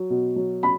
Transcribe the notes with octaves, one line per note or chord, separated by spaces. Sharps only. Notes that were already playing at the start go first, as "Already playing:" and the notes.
Already playing: F#3
B2
F#3
B5